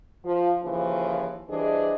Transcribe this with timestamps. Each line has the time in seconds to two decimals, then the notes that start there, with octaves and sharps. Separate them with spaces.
0.24 F3
0.62 D#2 C#3 E3 F3
1.49 E3 G3 D4 G#4 C5 D#5